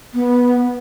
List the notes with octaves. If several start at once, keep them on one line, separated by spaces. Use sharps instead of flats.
B3